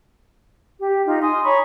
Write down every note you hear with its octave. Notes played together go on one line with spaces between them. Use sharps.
G4
D#4 F4 D#5
G#5 C6 D#6
C#5 A#5 B5 C#6